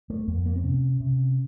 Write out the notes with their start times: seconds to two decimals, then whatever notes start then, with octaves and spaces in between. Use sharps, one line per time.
0.10 A3
0.27 F2 A#3
0.46 A#3
0.56 C4
0.64 C3 C#4
1.00 C3